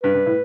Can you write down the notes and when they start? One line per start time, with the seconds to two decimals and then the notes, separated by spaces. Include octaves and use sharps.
0.03 G2 B4
0.14 G2
0.26 A2